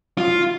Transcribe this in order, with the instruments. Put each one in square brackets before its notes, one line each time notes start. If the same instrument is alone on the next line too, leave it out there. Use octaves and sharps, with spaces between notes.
[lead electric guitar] F4